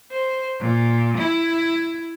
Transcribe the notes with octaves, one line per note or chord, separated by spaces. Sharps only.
C5
A#2
E4